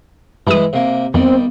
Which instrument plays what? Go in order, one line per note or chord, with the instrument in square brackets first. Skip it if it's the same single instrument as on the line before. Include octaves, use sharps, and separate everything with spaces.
[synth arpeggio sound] G2 D#6 [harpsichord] E3 G#3 E4
[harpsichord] C3 A#3
[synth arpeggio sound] F2 [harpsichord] D#3 G3 [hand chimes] B3 [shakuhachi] C4